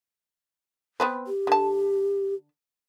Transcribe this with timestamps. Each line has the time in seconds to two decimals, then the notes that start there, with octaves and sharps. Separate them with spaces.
1.00 B3 C4 B4
1.27 G4
1.47 D3 A5